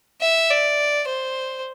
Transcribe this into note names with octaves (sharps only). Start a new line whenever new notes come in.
E5
D5
C5